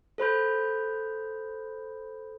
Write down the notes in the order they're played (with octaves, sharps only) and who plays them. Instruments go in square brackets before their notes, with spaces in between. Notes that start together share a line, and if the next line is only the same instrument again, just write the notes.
[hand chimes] A4 C5 B5 G6